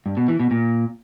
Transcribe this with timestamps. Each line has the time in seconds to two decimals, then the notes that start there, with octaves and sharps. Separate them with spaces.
0.06 G2
0.17 B2
0.28 E3
0.40 B2
0.51 A#2